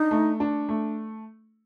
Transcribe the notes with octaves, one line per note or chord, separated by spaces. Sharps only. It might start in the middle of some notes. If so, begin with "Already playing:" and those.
Already playing: D4 D#4
A3
D4
A3